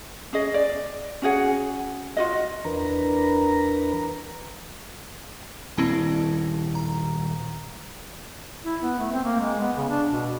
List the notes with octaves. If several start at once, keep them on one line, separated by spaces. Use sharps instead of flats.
C#4 G#4 D#5
D5
C#4 F#4 G#4 F#5
F4 F#4 D#5
E2 E3 D4 A#4 B4 A#5
D#1 C4 E4 A5
A#5
E4
B3
A3
C4
A#3
G#3
B3
C#3
D4
B2